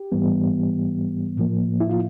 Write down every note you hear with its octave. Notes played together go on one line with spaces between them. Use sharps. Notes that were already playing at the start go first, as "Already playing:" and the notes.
Already playing: G4
G#2 E3 G3 B3
A2 F3 A#3
E4
F4